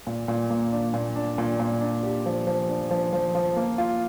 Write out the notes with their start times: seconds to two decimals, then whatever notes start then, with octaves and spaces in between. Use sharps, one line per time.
0.07 A#2
0.28 A#2
0.50 A#3
0.72 D4
0.94 A#2
1.16 D4
1.38 A#2
1.60 A#2
1.81 D4
2.03 G4
2.26 F3
2.47 F3
2.69 D4
2.91 F3
3.13 F3
3.35 F3
3.57 A#3
3.78 F4